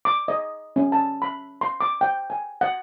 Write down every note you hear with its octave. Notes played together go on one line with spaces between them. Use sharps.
D6
D#5
C#4
A5
B5
C6
D6
G5
G#5
F#5